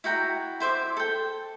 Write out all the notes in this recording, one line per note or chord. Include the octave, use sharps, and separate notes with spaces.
E4 F#4 G5 A#5
E4 C5 E5 D6
A4 G5